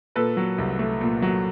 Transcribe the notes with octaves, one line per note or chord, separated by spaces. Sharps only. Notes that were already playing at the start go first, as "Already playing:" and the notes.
A#2 A4 B4
F#3
C2
A3
A#2
F#3